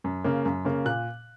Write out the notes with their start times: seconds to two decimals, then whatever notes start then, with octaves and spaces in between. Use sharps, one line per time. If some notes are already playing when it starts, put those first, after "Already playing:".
0.04 F#2
0.24 C#3 A#3
0.46 F#2
0.65 C#3 A#3
0.85 A#2 F#6